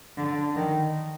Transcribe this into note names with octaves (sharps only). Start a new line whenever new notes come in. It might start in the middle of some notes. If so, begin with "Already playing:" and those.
D3
D#3